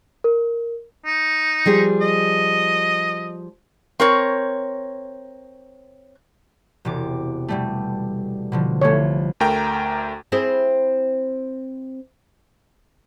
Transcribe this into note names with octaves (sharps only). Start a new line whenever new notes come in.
A#4
D#4
F3 G3 G#4
D#5
C4 A#4 C#5
E1 C3 D6
B2 G3 A3
B2 D3 F3
C2 F3 A3 C#5
D2 A3 A#4 G5 A#5
C4 E4 G#4